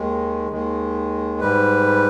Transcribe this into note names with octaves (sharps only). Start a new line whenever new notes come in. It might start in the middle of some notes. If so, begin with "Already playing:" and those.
Already playing: D#2 D#3 G#3
D#2 D#3 G#3
G#2 G3 B4